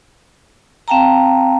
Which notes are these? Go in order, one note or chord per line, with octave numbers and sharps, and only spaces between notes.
C4 F5 G5 A5 A#5